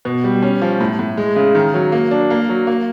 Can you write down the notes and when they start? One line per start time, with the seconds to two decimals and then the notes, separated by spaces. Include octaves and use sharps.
0.05 B2
0.24 G3
0.42 C#4
0.62 F3
0.81 A2
0.99 A2
1.17 G#3
1.36 C#3
1.55 D#3
1.74 F#3
1.92 A#3
2.11 D4
2.30 A#3
2.49 F#3
2.67 A#3